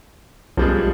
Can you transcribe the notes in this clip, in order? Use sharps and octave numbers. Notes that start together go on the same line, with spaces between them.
B1 F3 G3 G#3